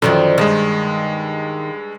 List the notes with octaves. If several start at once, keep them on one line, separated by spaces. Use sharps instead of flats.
F#2 D3 D#3 F3
G2 D#3 G#3